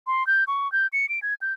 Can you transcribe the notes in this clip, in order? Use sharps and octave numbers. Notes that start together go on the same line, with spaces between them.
C6
G6
C#6
G6
C#7
D7
G#6
G6